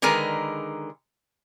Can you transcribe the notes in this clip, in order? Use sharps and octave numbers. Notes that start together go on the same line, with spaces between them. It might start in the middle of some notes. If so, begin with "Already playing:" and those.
D3 D#3 G#3 G#4 A#4 B4